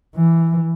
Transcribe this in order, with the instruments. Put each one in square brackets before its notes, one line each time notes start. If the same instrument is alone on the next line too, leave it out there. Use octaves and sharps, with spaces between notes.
[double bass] E3